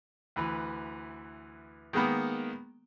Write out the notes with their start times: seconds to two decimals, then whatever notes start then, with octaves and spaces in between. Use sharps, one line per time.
0.36 D2 E3 B4
1.93 D#3 G#3 A#3 B3